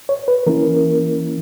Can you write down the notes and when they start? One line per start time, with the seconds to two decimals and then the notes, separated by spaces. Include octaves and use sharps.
0.09 C#5
0.28 B4
0.46 E3 A#3 C#4 E4 A#4